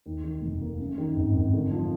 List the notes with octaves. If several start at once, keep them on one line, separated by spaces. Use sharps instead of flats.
D#2
D#3
F1
A#3
F#2
D#3
G#1
G#1
D3
F3